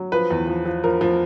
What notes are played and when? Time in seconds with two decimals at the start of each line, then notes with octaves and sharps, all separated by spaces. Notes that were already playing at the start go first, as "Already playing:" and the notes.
Already playing: F#3
0.12 F3 B4
0.31 E2
0.47 F3
0.66 F3
0.84 F3 A#4
1.01 F3